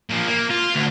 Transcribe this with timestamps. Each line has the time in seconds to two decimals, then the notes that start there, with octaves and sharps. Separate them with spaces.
0.10 A#2 F3
0.28 A#3
0.51 F4
0.76 D2